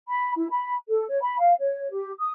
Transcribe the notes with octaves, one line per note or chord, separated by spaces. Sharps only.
B5
E4
B5
A4
C#5
B5
F5
C#5
G4
D#6